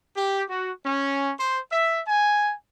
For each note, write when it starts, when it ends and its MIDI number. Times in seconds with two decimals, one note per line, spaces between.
0.16 0.43 67
0.49 0.71 66
0.85 1.30 61
1.39 1.60 72
1.71 2.00 76
2.06 2.52 80